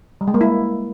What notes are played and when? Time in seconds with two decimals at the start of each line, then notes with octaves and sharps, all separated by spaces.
0.21 G3
0.28 G#3
0.34 A#3
0.41 E4